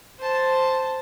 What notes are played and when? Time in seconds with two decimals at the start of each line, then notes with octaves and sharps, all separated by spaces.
0.19 C5 A5